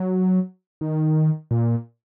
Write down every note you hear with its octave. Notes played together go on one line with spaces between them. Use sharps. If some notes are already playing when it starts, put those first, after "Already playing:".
Already playing: F#3
D#3
A#2